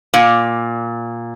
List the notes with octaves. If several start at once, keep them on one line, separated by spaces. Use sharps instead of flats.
A#2